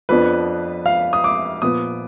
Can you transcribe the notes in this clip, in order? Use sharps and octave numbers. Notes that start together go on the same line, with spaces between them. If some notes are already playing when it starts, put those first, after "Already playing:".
F2 F3 B3 D4 B4
F5
D#6
D6
A#2 F3 B3 D#6